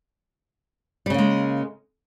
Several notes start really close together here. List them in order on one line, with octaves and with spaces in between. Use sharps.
G3 C#3 A#3 G#3